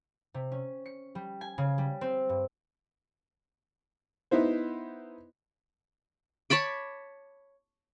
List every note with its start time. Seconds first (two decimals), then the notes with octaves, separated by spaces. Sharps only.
0.34 C3
0.52 C#4
0.86 C#7
1.15 G3
1.41 G#5
1.58 C#3
1.78 G3
2.01 C4
2.29 G2
4.31 B3 D#4 E4 C5
6.50 C#5 A5 B5 D6